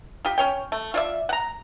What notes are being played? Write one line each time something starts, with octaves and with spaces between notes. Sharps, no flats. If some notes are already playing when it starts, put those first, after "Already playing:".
F4 G4
C#4 C#5 G5
A3
F4 D5 E5
F#5 A#5